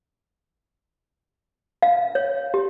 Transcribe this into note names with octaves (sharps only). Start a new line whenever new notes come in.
F5
C#5
G4